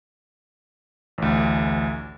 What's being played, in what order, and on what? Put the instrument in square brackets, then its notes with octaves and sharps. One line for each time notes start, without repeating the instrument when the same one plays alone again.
[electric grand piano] A1 D2